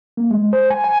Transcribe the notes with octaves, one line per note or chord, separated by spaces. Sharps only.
A#3
G#3
C5
G#5
G#5